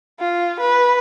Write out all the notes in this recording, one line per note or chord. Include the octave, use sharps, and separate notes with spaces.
F4
B4